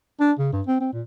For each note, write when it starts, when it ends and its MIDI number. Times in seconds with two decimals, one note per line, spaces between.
0.21 0.32 62
0.39 0.51 49
0.53 0.62 43
0.67 0.77 60
0.81 0.89 60
0.93 1.02 46